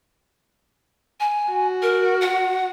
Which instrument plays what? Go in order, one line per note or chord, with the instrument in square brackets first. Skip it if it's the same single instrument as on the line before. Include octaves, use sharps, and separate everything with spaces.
[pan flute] G#5
[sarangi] F#4
[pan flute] A#4
F#5